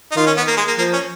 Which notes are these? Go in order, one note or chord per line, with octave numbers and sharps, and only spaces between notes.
D#4
D#3 F4
C#4
B3
A#3
G#3
A#3
F3 A#3
C#4